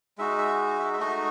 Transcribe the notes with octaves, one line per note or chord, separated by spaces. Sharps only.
G#3 D#4 F#4 E5
E5
E5
E5
A3 D#4 F#4 D#5